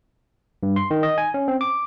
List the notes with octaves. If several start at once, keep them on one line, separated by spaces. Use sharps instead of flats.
G2
C6
D#3
D#5
G#5
C#4
C4
D6